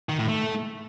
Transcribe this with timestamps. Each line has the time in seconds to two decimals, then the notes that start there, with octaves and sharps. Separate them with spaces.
0.09 D#3
0.19 A2
0.28 A3